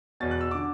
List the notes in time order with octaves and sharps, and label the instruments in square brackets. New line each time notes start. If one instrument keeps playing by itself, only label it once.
[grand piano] E2 B2 A6
F#6
E6
D3 D6